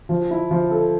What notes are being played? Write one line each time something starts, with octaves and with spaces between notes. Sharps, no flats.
F3
E4
F3
A4